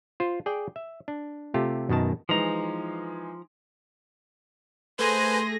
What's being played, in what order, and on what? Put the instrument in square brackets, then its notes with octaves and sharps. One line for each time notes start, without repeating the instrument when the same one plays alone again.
[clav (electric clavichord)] F4 C5
G#4 D5 G5
E5
D4
C3 A3 F4 G4
F#2 B2 D#3 A5
[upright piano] E3 G#3 D#4 [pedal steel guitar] F3 A#5
[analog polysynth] A3 A#6 [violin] G#4 [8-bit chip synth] B4 C5 G#5 [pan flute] C6